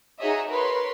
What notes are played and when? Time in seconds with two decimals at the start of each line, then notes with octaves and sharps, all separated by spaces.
0.19 D#4 F#4 G#4 C#5 D#5 E5
0.48 A#4 B4 C#5 C6